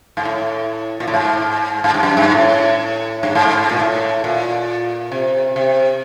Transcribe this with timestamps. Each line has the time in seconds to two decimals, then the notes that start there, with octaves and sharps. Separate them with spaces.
0.17 G#2
0.25 A2
1.00 A#2
1.07 A2
1.14 G#2
1.84 G#2
1.94 G2
2.03 F#2
2.17 G2
2.32 A2
3.23 G2
3.35 G#2
3.69 A#2
3.79 A2
4.24 A#2
5.12 C3
5.56 C3